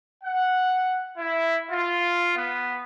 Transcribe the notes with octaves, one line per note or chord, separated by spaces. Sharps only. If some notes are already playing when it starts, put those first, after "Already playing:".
F#5
E4
F4
B3